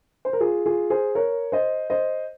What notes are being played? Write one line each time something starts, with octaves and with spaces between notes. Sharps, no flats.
C5
A#4
F4 G#4
F4 G#4
G#4 C5
A#4 C#5
C5 D#5
C5 D#5